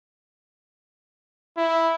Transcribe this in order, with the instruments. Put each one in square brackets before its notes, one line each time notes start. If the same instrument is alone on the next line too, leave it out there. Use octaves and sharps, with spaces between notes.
[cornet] E4